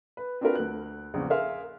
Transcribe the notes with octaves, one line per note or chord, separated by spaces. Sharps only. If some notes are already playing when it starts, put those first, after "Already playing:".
B4
C4 D4 F4 F#4 A#4 B4
D2 F#6
A#1 E2 C#3
G#4 A#4 E5 F5 C6 F6